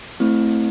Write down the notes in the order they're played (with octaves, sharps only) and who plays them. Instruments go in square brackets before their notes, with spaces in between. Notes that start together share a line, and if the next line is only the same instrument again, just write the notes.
[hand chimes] A3 C4 E4